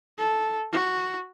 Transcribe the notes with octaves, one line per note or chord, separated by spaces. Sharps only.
A4
F#4